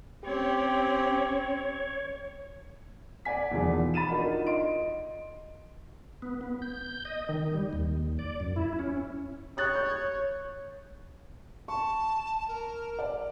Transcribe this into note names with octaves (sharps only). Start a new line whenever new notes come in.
C4 C#4 G4 C#5
D5 F#5 G#5 B6
E2 B2 D#3 F3
B5 A6 D#7 E7
D4 D#4 F4 F#4 A#4
D#5 C6 D7
B3
B3
G6
D#5
D#3
G3
D#2
D5
F#2
E4
C#4
C#5 D#6 F#6 A6
G6
A5 C#6
A#4
D5